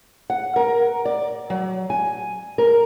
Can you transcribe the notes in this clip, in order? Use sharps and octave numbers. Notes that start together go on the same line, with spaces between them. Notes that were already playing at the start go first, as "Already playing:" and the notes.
F#5
A#4
D5
F#3
G#5
A#4